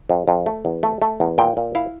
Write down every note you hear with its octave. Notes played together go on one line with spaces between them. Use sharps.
F2
F2
A3
E2
A3
A3
E2
A#2 G5
A#2
E4 F5